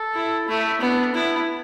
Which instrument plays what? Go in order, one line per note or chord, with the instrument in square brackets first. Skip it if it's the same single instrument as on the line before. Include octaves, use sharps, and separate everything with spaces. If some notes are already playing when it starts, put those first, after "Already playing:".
Already playing: [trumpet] A4
[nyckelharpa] E4
[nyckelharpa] A3 [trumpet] E4
[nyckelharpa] B3 [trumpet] D4
[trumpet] B3 [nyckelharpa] E4